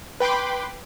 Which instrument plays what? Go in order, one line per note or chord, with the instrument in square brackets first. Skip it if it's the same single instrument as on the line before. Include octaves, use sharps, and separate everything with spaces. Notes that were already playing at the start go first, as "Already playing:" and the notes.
[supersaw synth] B4 G5 B5 C6 D6